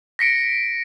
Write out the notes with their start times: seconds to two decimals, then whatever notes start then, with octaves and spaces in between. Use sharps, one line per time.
0.19 A#6 B6 C#7 D7